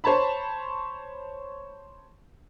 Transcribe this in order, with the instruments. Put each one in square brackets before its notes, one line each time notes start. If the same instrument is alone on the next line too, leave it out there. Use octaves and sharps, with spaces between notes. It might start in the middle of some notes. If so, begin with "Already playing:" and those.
[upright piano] C5 C#5 A5 B5